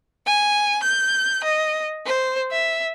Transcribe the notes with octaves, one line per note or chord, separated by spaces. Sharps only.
G#5
G6
D#5
C5
E5